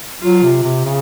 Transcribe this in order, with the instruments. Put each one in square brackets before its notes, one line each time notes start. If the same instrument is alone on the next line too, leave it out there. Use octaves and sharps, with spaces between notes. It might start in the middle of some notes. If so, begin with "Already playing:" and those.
[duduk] F#3 [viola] F4
[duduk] C3
C3
C#3